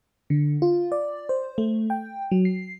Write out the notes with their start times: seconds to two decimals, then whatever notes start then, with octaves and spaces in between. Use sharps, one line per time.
0.30 D3
0.62 F4
0.92 D5
1.29 C5
1.58 A3
1.90 G5
2.31 F#3
2.45 C7